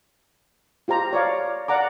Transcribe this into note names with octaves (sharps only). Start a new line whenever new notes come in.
F4 G4 C5 A#5
C#5 D5 F5
D5 F5 F#5 A#5 D6